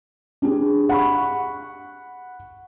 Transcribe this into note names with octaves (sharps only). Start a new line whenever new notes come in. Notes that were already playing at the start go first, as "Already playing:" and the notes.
D4 G4 G#4
F#5 B5 C#6